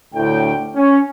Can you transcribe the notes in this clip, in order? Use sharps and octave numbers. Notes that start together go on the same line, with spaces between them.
D2 A2 G5
C#4